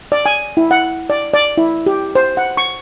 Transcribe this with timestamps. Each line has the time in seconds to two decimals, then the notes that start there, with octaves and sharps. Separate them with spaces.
0.12 D5
0.26 G#5
0.57 E4
0.71 F#5
1.10 D5
1.34 D5
1.57 E4
1.86 G4
2.15 C5
2.37 F#5
2.57 C#6